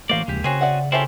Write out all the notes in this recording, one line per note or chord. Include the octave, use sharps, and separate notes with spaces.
E3 A3 A#3 F#4 C5 D5 F5
D#2 C#3 F3 G#3 G4
C#3 C4 C#4 F#4 G#4
D5 E5 F#5
C4 C#4 E4 F4 G4 A4 E5 A5